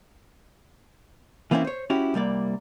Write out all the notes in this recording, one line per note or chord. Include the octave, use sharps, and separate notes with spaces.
E3 A#3 C4 C#4 E4
C5 C#5
C#4 E4 F#4 G4
C2 G3 A#3 D5